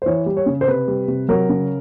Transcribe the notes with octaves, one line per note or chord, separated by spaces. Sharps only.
C5
E3 C#5
G3
C#5
C#3
C5
C3 B4
G3
C3
F#3 A#4
C#3